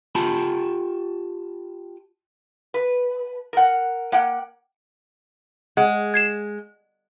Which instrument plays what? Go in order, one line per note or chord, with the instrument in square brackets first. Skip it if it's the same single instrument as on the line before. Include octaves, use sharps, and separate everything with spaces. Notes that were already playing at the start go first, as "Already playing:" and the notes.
[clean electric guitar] F4 G4 A5 B5
[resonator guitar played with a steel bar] B4
A#4 F#5
A#3 F#5 G5
[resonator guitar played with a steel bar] G#3 [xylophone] F#5
[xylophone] G#6 C7 E7